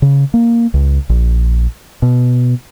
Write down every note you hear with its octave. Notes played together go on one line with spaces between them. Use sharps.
C#3
A#3
C#2
A#1
B2